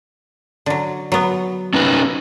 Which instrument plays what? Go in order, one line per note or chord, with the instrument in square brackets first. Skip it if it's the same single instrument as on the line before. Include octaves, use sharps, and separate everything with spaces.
[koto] D3 F#3
F#3 B3
[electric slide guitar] C#4 D#4 B4